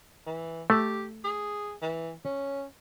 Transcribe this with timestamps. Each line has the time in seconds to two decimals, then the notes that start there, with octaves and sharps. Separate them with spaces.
0.27 E3
0.70 A3 G4
1.24 G#4
1.82 E3
2.25 C#4